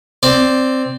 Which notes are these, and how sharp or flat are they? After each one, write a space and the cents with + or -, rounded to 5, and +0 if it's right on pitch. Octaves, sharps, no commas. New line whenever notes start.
C4 +0 D5 +0